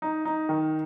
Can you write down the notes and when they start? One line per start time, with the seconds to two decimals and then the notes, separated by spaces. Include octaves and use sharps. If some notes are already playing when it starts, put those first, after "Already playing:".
0.02 D#4
0.25 D#4
0.49 D#3